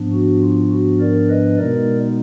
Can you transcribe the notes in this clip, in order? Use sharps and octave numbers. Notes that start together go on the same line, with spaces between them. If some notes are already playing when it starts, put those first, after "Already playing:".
Already playing: G#2 F3 B3 D4
F#4
F4
F#4
A#4 D5
B4 D#5
B2 G#3 B3 D#4 A#4 D5